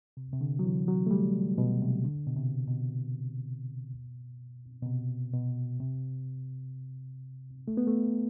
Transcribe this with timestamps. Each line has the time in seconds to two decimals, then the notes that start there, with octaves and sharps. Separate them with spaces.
0.17 C3
0.33 C3
0.41 D3
0.59 F#3
0.65 E3
0.88 F#3
1.06 A3
1.11 G3
1.58 B2
1.82 C3
2.05 D3
2.27 B2
2.36 C3
2.67 B2
4.82 B2
4.86 C3
5.33 B2
5.80 C3
7.68 A3
7.77 B3
7.87 A3